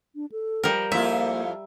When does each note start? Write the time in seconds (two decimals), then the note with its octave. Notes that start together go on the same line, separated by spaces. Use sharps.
0.15 D4
0.32 A4
0.63 F3 G3 A#4
0.92 F2 A#3 E4 F4 E5